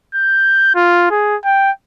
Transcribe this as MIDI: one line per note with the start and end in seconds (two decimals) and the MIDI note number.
0.15 0.72 91
0.75 1.10 65
1.11 1.36 68
1.45 1.71 79